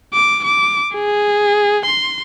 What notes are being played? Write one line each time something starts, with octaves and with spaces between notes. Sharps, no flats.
D6
D6
G#4
C6